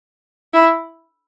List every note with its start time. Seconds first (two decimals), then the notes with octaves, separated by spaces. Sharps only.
0.53 E4